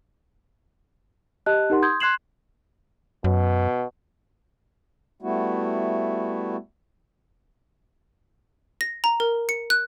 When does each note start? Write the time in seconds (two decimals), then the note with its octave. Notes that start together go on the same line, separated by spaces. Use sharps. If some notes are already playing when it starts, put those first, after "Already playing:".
1.46 G4 D#5 A5 F#6
1.70 D#4 G4 A#4 F#5 C6
1.82 C6 D#6 G6 G#6
2.00 C6 F#6 G#6 C7 E7 F#7
3.24 F#2 B2
5.22 G3 A3 B3 E4 F#4
8.81 A#6
9.04 A#5
9.20 A#4
9.49 C#7
9.70 F#6